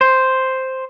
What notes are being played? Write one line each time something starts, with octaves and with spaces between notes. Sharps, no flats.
C5